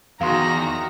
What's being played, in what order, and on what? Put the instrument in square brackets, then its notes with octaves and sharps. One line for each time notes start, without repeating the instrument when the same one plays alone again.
[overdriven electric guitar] E2 [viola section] D#3 F#4 [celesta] F5 C6 [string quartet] A#5